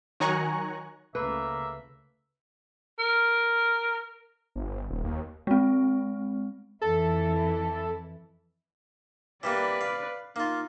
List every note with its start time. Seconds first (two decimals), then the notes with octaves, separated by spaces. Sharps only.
0.20 D#3 F#3 G#5 A#5 C#6 F#6
1.15 C#2 C#3 A3 A#3 B4 E5
2.99 A#4
4.56 G1
4.90 D#1
5.04 D#2
5.47 G#3 C4
6.81 F2 E3 E4 A4
9.43 E3 G3 A#3 B4 D5
9.81 F5
10.36 A#3 D#4 F4